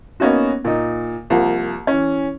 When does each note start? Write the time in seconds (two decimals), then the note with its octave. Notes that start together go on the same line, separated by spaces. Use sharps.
0.20 A#3 B3 C#4 D#4 F#4
0.65 A#2 D#4
1.30 C2 F3 A#3
1.87 E3 C#4